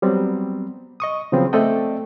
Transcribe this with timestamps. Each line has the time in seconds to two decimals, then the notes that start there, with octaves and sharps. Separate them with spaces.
0.02 F#3 G3 B3 C4
1.00 D#5 C#6 D#6
1.32 C#3 F3 F#3 B3 C4
1.53 A3 C4 A4 D5 D#5 G5